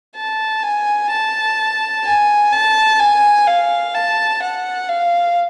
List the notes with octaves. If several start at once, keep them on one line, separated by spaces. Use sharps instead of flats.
A5
G#5
A5
G#5
A5
G#5
F5
A5
F#5
F5